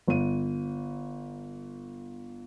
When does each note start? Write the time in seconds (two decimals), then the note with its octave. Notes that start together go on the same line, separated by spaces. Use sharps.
0.08 G1 D#7